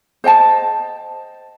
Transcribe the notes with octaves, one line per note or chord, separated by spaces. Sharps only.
C5 D#5 G5 A5